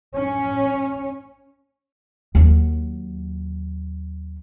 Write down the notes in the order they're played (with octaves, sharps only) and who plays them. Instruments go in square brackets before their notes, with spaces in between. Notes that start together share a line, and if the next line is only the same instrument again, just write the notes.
[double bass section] C#4
[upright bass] D#2 F#3